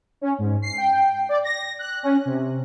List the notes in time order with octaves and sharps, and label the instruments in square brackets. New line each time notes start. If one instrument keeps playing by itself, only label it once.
[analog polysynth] C#4
G#2
C7
G5
D5
A#6
F#6
C#4
C3